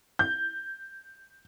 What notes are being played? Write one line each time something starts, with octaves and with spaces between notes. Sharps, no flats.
G6